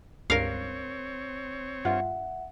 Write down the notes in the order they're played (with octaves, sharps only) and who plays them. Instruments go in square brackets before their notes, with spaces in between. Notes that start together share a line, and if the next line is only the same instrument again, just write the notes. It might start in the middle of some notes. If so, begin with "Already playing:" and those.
[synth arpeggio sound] C#2 G2 [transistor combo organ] C4 C#5 [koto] A#4 F5
[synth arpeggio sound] G2 F4 [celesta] E5 F#5